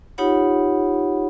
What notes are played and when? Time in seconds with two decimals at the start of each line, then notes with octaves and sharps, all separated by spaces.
0.18 D#4 F4 G4 C#5 F#5 B5